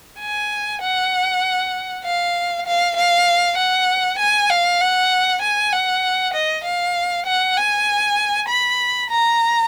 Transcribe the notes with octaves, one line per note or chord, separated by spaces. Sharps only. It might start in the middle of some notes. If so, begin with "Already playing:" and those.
G#5
F#5
F5
F5
F5
F#5
G#5
F5
F#5
G#5
F#5
D#5
F5
F#5
G#5
B5
A#5